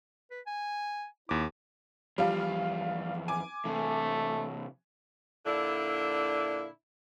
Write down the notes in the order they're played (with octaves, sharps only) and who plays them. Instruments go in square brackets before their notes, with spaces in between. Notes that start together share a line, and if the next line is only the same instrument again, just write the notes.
[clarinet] B4
G#5
[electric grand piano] D#2 D6 [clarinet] E4
[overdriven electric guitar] F2 E3 [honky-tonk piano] G3 F4 F5
[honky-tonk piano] G#5 D6
[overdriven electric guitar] C3 E3 [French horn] A3
[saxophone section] A#2 D3 D4 E4